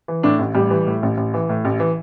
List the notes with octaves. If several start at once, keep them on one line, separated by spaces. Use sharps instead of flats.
E3
A2 D4
A1
A1 G3
E3
A2
A1
A1
E3
A2
A1
E3